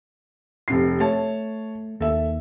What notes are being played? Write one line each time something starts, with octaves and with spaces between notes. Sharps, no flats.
F1 C3 C7
A3 C#5 A5
D#2 A4 E5